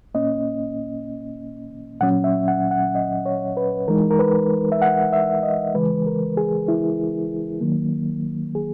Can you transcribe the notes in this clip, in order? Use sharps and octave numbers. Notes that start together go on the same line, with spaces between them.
A#2 A#3 C#4 D#5
A#2 F#3 C#4 F#5
E5
F#5
F#5
D#5
C#5
B4
E3 G#3 D#4 A#4
A#4
B4
E5
F#5
E5
D#5
C#3 E3 G#3 B4
A#4
G#4
E4
D#3 F#3 A#3
G#4